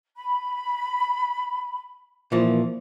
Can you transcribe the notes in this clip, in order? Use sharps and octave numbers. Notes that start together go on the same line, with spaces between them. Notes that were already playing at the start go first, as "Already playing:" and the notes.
B5
A#2 E3 F3